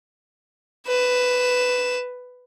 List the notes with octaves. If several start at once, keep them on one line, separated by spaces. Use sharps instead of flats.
B4 E7